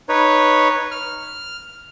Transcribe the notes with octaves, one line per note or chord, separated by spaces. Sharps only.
D#4 B4 C#5
F6